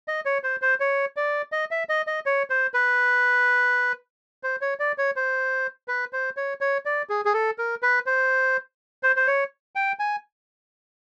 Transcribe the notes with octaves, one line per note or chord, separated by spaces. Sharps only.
D#5
C#5
C5
C5
C#5
D5
D#5
E5
D#5
D#5
C#5
C5
B4
C5
C#5
D5
C#5
C5
B4
C5
C#5
C#5
D5
G#4
G#4
A4
A#4
B4
C5
C5
C5
C#5
G5
G#5